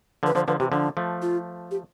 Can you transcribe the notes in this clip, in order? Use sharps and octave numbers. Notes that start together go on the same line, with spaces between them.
D3 F3 B4
D3 F3 C5
D3 F3 B4
C3 E3 G4
D3 F3 D4
F3 A3
F4
G4